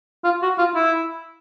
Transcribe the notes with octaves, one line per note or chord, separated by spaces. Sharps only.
F4
F#4
F4
E4